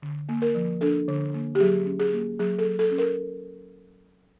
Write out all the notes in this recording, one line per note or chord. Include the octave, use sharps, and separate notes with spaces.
D3
A#3
A#4
F3
D4 A4
D3
A#3
G4
F#3 G#4
C#4
G#4
A#3
F#3 G#4
A4
F#3
A4
C#4
A#4